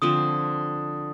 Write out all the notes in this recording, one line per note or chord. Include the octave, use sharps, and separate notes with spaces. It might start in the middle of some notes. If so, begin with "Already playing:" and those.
D3 F3 C4 D#6